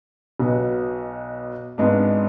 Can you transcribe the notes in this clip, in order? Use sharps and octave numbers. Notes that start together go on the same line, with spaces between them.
B1 B2 B3
G#1 G#2 G#3 B3 D4